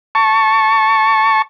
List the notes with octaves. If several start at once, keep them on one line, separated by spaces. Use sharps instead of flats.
A5 C#6